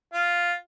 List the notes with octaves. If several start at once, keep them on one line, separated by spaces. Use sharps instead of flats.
F4